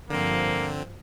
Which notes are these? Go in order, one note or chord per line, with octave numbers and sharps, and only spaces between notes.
G2 D3 F3 A#3 C4